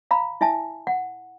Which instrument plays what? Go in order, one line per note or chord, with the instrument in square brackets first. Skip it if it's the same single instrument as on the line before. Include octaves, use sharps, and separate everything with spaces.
[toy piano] F5 A#5 B5
E4 E5 G#5 A5
F#5